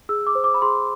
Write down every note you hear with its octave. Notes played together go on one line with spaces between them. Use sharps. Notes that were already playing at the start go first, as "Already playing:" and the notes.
G#4 E6
D6
C5
D6
B5
G#4 C6